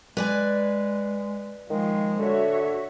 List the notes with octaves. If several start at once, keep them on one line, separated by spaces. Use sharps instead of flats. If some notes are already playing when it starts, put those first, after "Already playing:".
G#3 B4 D5 G#5
D#3 F3 G#3
D3 F#4 C#5 E5